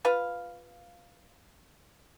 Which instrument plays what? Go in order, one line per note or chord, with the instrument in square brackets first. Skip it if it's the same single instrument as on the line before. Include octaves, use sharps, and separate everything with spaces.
[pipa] F4 B4 F5